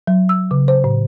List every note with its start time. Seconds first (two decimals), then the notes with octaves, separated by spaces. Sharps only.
0.07 F#3
0.29 E6
0.51 C#3
0.68 C5
0.84 A2